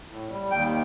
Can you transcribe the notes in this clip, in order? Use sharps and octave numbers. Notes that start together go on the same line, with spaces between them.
A2
G3
D#2 G5